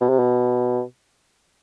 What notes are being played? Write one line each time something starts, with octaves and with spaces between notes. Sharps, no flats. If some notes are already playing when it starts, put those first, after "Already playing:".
B2
C3
B2